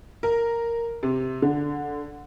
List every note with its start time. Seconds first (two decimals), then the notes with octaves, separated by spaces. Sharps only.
0.23 A#4
1.03 C3
1.42 D3